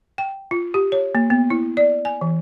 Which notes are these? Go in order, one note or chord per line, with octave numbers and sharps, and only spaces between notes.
G5
F4
G4
C#5
A#3
B3
E4
D5
G#5
E3